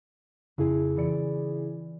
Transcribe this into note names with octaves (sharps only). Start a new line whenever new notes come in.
F2 C#3 E4 G#4
E3 D5 C#7